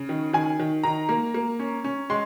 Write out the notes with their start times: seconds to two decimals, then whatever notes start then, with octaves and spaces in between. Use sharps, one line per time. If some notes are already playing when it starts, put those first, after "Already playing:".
Already playing: C#3
0.09 D#3
0.33 D#3 G#5
0.59 D#3
0.83 D#3 A#5
1.09 A#3
1.34 A#3
1.59 C#4
1.84 C#4
2.10 G#3 C6